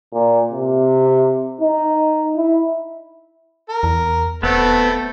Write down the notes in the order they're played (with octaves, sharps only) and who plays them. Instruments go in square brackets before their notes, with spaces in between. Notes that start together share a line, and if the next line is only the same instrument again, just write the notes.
[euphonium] A#2
C3
D#4
E4
[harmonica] A#4
[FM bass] E2
[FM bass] D#1 [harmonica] A3 C4 A4 [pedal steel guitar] B3